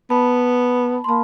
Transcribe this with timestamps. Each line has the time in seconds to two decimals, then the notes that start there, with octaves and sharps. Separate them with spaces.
0.10 B3 A5 B5
1.04 C6
1.08 A#3 A5 B5